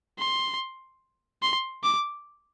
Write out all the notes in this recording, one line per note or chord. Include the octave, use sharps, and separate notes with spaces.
C6
C6
D6